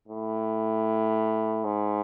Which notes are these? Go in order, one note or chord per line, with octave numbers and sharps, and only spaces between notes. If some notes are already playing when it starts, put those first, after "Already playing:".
A2
G#2